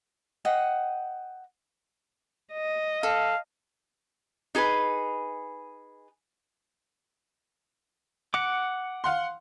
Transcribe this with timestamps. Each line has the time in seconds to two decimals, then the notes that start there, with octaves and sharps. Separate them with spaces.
0.45 D#5 F#5 G5
2.52 D#5
3.03 A4 F5
4.55 D#4 G#4 A4 B4
8.34 F#5 D6 C#7
9.04 F5 F#5 C6